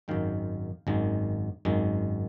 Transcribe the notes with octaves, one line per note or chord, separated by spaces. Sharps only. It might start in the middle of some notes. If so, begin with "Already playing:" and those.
G#1 F#2 D#3 G#3 F5 G5
G#1 F#2 D#3 G#3
G#1 F#2 D#3 G#3